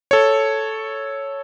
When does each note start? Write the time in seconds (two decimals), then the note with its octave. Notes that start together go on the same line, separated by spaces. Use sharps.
0.11 A4 C#5